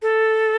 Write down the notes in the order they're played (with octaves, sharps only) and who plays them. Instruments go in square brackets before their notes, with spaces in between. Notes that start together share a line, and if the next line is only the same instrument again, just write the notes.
[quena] A4